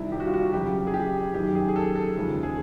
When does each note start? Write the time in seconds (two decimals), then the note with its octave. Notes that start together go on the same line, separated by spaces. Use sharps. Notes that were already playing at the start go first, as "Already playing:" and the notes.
Already playing: C2 C3 D#3 E4
0.12 G4
0.20 F#4
0.26 F4
0.34 F#4
0.53 F2 C#3 F#3 G4
0.87 G#4
0.94 G4
1.34 F#2 D#3 F#3 G4
1.55 G#4
1.69 G#4
1.76 A4
1.96 A4
2.16 D#2 C#3 F3 G#3 A4
2.43 G#4